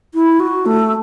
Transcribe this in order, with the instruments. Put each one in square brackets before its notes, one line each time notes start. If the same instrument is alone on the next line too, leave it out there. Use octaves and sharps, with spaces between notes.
[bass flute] E4
F#4
A3